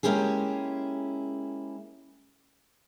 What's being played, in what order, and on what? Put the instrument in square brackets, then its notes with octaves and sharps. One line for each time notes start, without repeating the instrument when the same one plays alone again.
[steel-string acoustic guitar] G#3 A#3 C#4 E4 G4 G#4